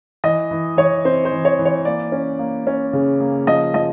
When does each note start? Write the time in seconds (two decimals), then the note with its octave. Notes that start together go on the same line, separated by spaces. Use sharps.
0.24 E3 D#5
0.51 E3
0.77 E3 C#5
1.05 C4 C5
1.25 C5
1.32 E3
1.45 C#5
1.59 E3
1.65 C#5
1.85 A#3 D5
2.12 C#4
2.39 A#3
2.67 C#4
2.93 C#3
3.20 A#3
3.47 F3 D#5
3.74 F3 D#5